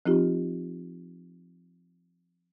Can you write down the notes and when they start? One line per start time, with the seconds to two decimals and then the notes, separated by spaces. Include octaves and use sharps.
0.06 F3 C4 D#4 F4 G4